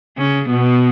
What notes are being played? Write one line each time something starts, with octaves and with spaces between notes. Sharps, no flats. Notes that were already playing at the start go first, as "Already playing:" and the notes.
C#3 C#4
B2 B3